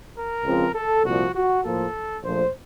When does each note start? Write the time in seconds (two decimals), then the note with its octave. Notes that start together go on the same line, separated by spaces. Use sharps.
0.16 A#4
0.44 C#2 C#3 F3 C4
0.74 A4
1.04 C2 A#2 F3 F#4
1.34 F#4
1.63 A2 F3 A#3 A4
2.23 A#1 A#2 F3 A3 C5